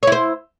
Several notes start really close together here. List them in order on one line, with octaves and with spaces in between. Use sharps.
C#5 E4 C5